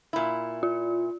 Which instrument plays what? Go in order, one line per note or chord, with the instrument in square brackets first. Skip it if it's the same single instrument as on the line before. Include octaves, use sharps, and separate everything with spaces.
[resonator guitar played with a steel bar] A#2 E4
[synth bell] F4